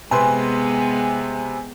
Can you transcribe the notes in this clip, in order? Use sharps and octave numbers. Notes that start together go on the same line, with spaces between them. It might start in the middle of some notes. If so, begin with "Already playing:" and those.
C3 G#3 B3 B4 G#5 C6